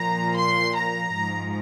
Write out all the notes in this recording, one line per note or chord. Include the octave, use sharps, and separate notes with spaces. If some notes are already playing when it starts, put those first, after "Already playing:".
Already playing: A#2 F3 A#5
C6
A#5
G#2 F3